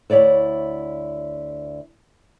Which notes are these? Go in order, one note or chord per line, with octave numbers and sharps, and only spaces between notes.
D2 E4 C#5 D5 E5